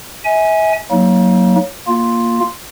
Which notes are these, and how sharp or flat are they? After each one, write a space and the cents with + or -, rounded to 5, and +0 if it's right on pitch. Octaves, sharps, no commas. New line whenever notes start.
E5 -35 G#5 +0
F#3 +0 A#3 +0 D#4 +30
A#3 +0 F4 +0